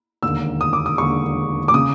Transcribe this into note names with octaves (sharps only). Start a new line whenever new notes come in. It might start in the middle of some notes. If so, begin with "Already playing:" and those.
E1 D#2 D3 E6
D#6
D6
D#6
E1 D#2 D3 C#6
D6
C#3 D#6